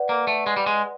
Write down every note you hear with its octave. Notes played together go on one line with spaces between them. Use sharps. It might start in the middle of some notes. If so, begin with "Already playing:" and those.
Already playing: B4 D5 F#5
A#3
A3
G#3
G3
G#3